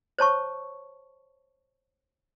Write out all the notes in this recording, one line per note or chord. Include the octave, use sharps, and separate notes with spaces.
C5 C#5 A5 C#6